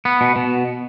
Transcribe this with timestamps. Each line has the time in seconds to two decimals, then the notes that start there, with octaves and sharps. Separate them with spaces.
0.05 B3
0.21 B2
0.36 B2